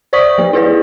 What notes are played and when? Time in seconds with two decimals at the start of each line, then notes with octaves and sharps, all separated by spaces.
0.13 C5 D5 C#6 D#6 B6 F#7
0.38 F3 B3 G4
0.53 E4 G4 G#4 B4 C#5 D5